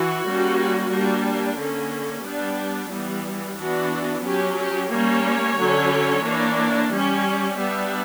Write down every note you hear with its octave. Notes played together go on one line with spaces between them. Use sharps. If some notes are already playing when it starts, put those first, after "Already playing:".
Already playing: E3 F#4
G3 A#3 C#4
G3 A#3 D4
D3 A#3 C#4
G3 B3 D4
E3 G3 B3
E3 B3 D4 F#4
F#3 C#4 G4
G4
G3 A#3 C#4 C#5
D3 F#3 C#4
E3 A#3 D4
G3 C#4
G3 B3 D4 E5